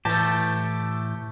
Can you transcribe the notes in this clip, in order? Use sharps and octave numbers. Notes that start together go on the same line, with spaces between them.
A2 E3 A3 G4 A5 A6 A#6